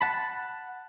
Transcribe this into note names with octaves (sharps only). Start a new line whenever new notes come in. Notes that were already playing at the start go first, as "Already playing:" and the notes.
F#5 A5 B5